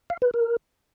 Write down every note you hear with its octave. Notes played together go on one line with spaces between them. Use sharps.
F5
B4
A#4